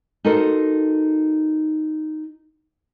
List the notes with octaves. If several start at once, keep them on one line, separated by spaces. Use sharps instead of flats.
D#4 F#4 A4 A#4 C5